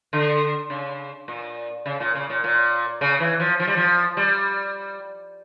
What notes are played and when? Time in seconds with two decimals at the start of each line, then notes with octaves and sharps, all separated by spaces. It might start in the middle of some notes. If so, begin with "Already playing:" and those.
0.13 D3
0.70 C#3
1.28 A#2
1.86 C#3
2.00 A#2
2.15 C#3
2.29 A#2
2.44 A#2
3.01 C#3
3.20 E3
3.40 F3
3.60 F3
3.67 G3
3.77 F3
4.17 G3